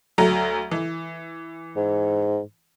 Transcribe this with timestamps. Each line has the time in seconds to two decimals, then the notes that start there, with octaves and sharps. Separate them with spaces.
0.18 D2 F#3 A#5
0.72 E3
1.76 G#2